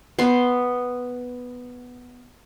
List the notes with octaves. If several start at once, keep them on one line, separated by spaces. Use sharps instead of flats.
B3 C6